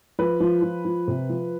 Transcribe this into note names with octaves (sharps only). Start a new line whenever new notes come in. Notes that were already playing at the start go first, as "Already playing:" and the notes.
F3 B4
F3
F3
F3
C3
F3